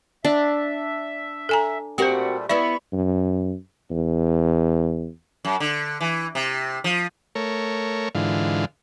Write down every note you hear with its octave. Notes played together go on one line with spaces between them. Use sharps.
D4 E5
A4 G#5 A#5
A#2 G3 A3 C4 F#4 G4 A#4 C5
B3 E4 D5 E5 B5 C#6
F#2
E2
F#2
D3
E3
C3
F3
A3 A#4 C#5
G#2 D3 E3 F4